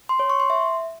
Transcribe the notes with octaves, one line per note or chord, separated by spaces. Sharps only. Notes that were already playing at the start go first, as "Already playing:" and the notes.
C6
C#5
C#6
C6
E5